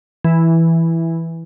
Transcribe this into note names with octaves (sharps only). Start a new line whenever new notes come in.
E3